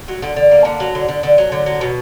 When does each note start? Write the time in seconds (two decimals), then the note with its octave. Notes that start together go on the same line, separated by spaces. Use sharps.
0.08 F#3
0.23 D3
0.36 D3
0.51 A#3
0.65 D3
0.80 F#3
0.95 D3
1.08 D3
1.23 D3
1.38 F#3
1.52 D3
1.66 F#3
1.81 B2